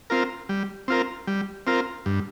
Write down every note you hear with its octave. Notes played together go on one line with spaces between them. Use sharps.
C4 F4 A#4
G3
C4 F4 A#4
G3
C4 F4 A#4
G2